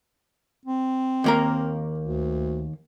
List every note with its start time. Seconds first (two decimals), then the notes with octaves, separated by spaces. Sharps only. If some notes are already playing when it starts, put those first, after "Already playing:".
0.66 C4
1.24 D#2 A#3 A#4
1.99 D2